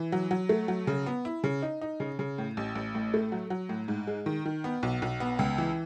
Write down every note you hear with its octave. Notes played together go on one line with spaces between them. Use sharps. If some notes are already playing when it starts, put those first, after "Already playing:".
Already playing: E3
F#3
F#3
A3
F#3
C#3
B3
E4
C#3
D#4
D#4
C#3
C#3
A2
A1
A1
A2
A3
F#3
F#3
A2
G#2
G#3
D#3
D#3
B3
B1
B1
B3
C#2
E3